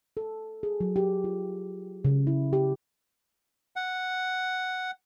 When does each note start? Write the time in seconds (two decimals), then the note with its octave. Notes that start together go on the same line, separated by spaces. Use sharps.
0.17 A4
0.63 G#4
0.80 F#3
0.96 G4
1.24 F4
2.05 C#3
2.27 E4
2.53 G4
3.76 F#5